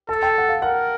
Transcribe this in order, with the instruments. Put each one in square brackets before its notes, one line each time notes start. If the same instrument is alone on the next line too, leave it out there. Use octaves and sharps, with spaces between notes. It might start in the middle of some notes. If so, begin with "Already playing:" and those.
[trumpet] A4 [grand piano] A5
[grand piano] G5
F#5
F5
[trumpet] A#4 [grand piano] F#5